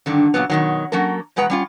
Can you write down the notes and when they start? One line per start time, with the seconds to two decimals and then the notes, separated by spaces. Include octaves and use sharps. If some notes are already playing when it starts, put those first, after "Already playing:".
0.06 G2 D3 D#3
0.34 A#2 C#3 F#3 B3
0.50 B2 D#3 F#3
0.92 F#3 A#3 C#4 A4 A#4
1.36 E2 B2 G#3 B4 F#5 A#5
1.50 G3 C#4 F4